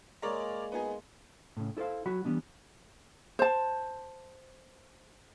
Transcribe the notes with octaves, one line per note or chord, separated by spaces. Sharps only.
G#3 A#3 A#4 C#5 D5
B3 D#4 G#4
A2 C#3
E4 A4 B4 C5 F5
F#3 F#4 B5
E3 G3 B3 D4
C5 A5